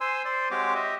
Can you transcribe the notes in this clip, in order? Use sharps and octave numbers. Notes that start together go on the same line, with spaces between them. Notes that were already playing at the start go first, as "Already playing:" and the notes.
C5 G#5 C6 E6
C5 D5 C6
G#3 C4 F#4 G4 C#5 D6
G4 D#5 E5